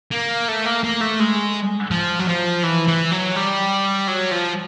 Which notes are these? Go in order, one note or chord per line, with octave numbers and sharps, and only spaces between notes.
A#3
A3
A#3
A#3
A3
G#3
F3
F#3
F3
E3
E3
F#3
G3
F#3
F3